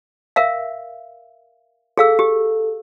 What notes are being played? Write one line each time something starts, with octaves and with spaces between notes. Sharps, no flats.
A#4 E5 F5
G#4 A4 F5 E6
G4